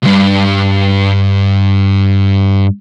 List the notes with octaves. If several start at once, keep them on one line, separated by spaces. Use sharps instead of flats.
C2 G2